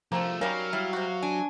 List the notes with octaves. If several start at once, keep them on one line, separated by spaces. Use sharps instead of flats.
C2 F3 A3 A#3 C4
D#3 F#3 G3 C#4 A#4 F5
G3 E4
C3 F#4
D4 G#5